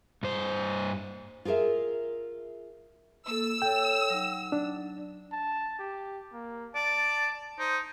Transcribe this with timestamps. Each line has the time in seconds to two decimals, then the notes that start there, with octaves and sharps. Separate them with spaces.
0.23 G2 C5
1.45 F4 G#4 A#4 D5 E5
3.27 A#3 A4 E6
3.62 A4 C#5 G5
4.10 F#3 D#4
4.52 D4
5.33 A5
5.79 G4
6.33 A#3
6.75 D5 A5
7.59 D#4 C5